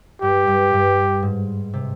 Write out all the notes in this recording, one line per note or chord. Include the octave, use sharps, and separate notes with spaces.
G2 G4
G2
G2
G#2
C3